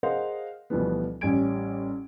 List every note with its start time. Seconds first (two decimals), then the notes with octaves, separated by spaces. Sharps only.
0.03 G#4 A#4 C5 D#5 F5 F#5
0.70 D2 B2 E3 F3 G3 B3
1.21 A1 G3 C#4 G#5 G#6 D7